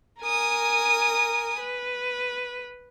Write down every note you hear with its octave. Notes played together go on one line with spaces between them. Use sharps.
A#4 G#5 D#6
B4